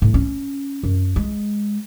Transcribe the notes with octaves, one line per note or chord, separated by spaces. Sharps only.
A2
C#4
F#2
G#3